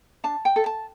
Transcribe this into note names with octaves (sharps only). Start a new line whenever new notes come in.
D4 A5
G5
A4
A5